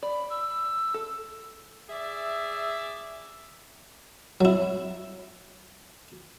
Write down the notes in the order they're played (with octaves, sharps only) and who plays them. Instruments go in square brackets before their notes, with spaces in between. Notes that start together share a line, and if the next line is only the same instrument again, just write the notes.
[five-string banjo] D5 [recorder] B5
[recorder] E6
[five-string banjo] A4
[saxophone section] G#4 D5 E5
[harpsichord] F#3 E4